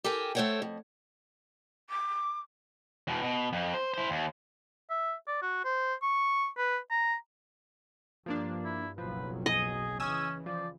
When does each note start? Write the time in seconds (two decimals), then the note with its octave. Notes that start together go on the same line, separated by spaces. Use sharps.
0.04 G4 A4 A#4 G5 G#5
0.35 A3 A4 C5 C#5 F#5 G5
0.62 F2
1.89 D6
3.07 E2 B2
3.23 B2
3.53 F2
3.74 C5
3.94 E4 C5
4.10 D#2
4.90 E5
5.27 D5
5.42 F#4
5.65 C5
6.02 C#6
6.57 B4
6.91 A#5
8.26 G2 F3 A#3 D4
8.65 E4
8.98 F#1 B1 F3 F#3 B4
9.46 G#4 D#5
10.00 C#3 E3 C#4 G#5 D#6 E6
10.46 F3 D5